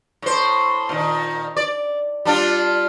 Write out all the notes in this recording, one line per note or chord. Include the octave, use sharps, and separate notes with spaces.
A2 C5
A#2 D#3
D5
G3 D4 F4